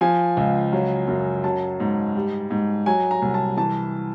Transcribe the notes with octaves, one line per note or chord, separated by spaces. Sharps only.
F3 G#5
C#2
F#3
F#2
F#3 A5
G#2
G3
G#2
F#3 G#5
A#5
C2
A5
E3 A5